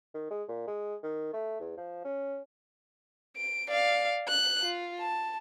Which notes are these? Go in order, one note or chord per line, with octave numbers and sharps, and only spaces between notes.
D#3
G#3
A#2
G#3
D#3
A3
E2
F3
C#4
D7
D5 F5
F#6
F4
A5